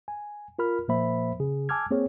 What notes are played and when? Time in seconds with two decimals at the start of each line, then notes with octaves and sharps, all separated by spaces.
0.08 G#5
0.59 F4 A#4 B5 F6
0.88 A#2 F3 A#3 C5 E5 B5
1.40 C#3 G#4
1.69 G#5 A5 D6 E6 F6 G#6
1.91 A#3 C4 G#4 C#5